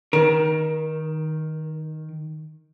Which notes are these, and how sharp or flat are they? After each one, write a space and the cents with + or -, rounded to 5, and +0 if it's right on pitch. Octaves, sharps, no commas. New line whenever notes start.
D#3 +0 A#4 +35